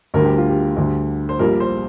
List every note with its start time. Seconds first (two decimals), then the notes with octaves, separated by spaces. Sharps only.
0.14 D2 D3 G3 A#4
0.26 G4
0.37 F4
0.49 G4
0.77 D2 D3 G3
1.29 C5
1.39 A#1 A#2 G3 A#4
1.60 C5